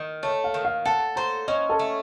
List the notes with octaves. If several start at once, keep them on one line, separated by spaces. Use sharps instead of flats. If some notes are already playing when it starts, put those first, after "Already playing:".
Already playing: D#3 D#5
A3 C#5
F5
D#3
F5
A4 F#5
C5 A#5
C#4 D#5
A4
A3